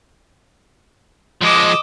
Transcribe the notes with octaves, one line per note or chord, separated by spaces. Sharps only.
F3 G#3 D#5 D6 E6